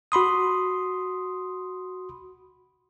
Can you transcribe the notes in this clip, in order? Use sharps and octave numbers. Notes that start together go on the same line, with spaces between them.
F#4 B5 C6 D#6